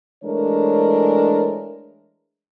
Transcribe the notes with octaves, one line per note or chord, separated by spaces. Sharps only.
E3 G#3 A3 D4 A#4 C#5